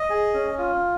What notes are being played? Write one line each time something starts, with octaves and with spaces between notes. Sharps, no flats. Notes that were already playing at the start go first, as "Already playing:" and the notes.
Already playing: D#5
G#4
C#4
F4